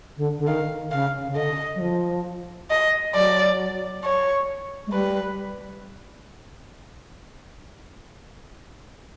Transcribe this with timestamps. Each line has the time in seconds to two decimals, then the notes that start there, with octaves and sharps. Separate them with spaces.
0.17 D3
0.38 D3
0.47 D#3 F5
0.91 C#3 F5
1.27 C#3
1.35 D3 D#5
1.75 F#3
1.81 F3
2.70 D#5
3.15 F#3 D5
4.04 C#5
4.87 G#3
4.92 G3 B4